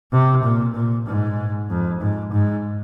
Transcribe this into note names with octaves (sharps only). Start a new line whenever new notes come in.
C3
A#2
A#2
G#2
F2
G#2
G#2